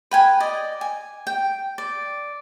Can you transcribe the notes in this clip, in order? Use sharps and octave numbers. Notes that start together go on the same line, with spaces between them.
B4 G5 G#5
D5 D#5
G#5
G5
D5